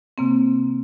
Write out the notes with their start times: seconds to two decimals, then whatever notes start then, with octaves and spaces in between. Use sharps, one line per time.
0.18 C3 A#3 C4